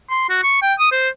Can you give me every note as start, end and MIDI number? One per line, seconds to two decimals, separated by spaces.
0.10 0.26 84
0.29 0.38 66
0.43 0.60 85
0.62 0.74 79
0.79 0.89 87
0.92 1.09 72